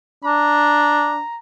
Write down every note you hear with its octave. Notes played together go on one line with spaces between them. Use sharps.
D4 A#5